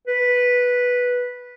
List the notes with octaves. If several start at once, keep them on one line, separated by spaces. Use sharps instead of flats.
B4